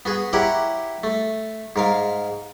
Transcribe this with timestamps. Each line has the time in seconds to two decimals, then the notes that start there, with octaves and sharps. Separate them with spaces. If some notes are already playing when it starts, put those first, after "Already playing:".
0.05 B3 F#4 G#4
0.33 E4 G4 A#4 C#5 F#5
1.04 A3
1.76 G#2 A#4 F5